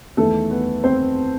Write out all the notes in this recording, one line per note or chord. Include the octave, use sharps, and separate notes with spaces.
E2 D#3 A3 A4
B3 B4
C4 C5